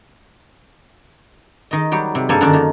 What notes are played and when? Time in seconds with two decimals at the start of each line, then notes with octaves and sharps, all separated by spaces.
1.71 D#3 D#5
1.92 F#3 G3 G4
2.15 C3
2.29 G2 A#3 A4 C5 G#5
2.41 F#2 D3 D#3 D4 D5
2.53 D#3